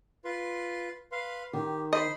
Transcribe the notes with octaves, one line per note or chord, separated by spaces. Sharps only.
F4 B4 C6
B4 F5 C6
D#3 G4
C5 D#5 B5 C6